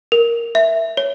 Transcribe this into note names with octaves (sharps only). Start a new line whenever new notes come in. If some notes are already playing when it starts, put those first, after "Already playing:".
A#4
E5
C#5